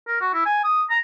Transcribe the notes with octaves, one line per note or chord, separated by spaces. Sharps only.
A#4
F#4
E4
G#5
D#6
A#5